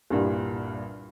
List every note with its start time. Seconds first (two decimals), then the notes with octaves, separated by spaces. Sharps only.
0.10 C2 G2 A#2 G3